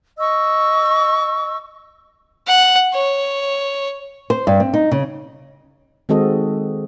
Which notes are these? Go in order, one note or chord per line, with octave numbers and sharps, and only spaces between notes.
D#5 C#6 E6
F#5
C#5
C5
G2
C4
D#4
C#3
D#3 G#3 C4 F#4 A4 D#5